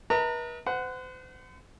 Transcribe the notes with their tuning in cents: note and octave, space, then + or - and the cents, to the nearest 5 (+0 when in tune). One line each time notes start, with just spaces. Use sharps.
B4 -40 D#5 +45 A#5 -40
C5 -40 F#5 +0